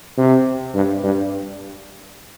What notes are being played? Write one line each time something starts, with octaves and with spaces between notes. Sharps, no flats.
C3
G2
G2